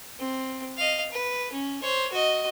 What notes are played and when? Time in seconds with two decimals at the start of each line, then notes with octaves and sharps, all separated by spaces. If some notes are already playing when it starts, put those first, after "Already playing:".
0.19 C4
0.77 D#5 F5
1.11 B4
1.52 C#4
1.82 C5 C#5
2.12 F#4 D#5